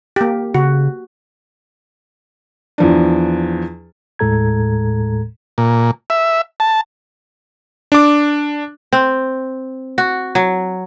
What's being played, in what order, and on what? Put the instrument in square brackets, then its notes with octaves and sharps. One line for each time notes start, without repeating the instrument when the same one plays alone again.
[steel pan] A#3 G4
[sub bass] C#3 [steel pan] F#4
[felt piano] E2 F3 D4
[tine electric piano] D#2 A2 G#3 A4 A#5 G#6
[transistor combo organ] A#2
E5
A5
[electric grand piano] D4 D6
[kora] C4
F#4
F#3